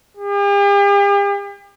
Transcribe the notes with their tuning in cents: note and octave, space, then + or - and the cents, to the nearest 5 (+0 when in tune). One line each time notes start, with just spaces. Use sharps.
G4 +45